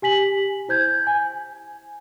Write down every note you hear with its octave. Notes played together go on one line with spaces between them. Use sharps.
G4 G#5 B6 F#7
E4 C5 G6 G#6
G#5